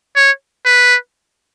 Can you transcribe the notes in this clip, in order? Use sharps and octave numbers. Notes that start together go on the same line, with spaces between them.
C#5
B4